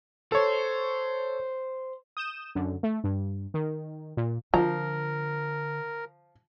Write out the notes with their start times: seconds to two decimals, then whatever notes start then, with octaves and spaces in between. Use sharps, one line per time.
0.32 A4 C5 C#5
2.17 D#6 G6 E7
2.55 F#2 D3
2.83 A3
3.04 G2
3.54 D#3
4.17 A#2
4.54 D3 F3 A#4 A#5